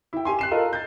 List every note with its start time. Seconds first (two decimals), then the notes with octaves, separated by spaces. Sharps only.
0.13 E4 G5
0.25 G4 G#5 C6
0.39 F#6 C7 E7
0.51 F4 A4 A#4 D#5
0.73 G6 A6